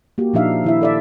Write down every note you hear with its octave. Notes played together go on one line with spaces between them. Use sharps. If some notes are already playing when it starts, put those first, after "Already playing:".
A#3 F#4 G4
A#2 F3 D4 D#4 E5 F5
D#3 E4 E5
A4 D5 E5